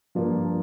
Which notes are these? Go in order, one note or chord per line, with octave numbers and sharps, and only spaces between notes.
G2 F3 A#3 D4 F4